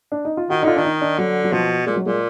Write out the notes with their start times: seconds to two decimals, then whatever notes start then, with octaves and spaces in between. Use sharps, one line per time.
0.12 D4
0.25 D#4
0.37 F4
0.50 D#3 F#4
0.62 D3 D#4 F4
0.76 D#3 D4
0.84 D#4
1.01 D4
1.18 D3 F#3
1.44 F#3
1.52 B2 F3
1.86 A#2 G#3
1.96 F#3
2.06 A#2 G#3